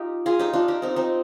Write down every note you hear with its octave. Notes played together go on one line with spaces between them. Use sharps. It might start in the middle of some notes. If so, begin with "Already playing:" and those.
Already playing: D#4 F4 G4
F4 G#4
D#4 G4
D4 F4
D#4 G4
C4 D#4
C4 D#4